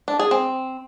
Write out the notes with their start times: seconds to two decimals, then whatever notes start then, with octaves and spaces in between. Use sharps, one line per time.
0.08 D4
0.19 G#4
0.31 C4